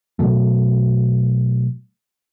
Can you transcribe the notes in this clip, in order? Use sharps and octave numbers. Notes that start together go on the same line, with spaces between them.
B2 F#3 A3